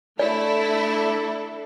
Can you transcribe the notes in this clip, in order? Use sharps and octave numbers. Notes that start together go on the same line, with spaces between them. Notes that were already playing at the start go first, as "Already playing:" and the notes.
A3 D4 E4 A4 D5